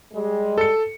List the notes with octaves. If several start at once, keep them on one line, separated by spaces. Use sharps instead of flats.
G3 G#3
A4 C#7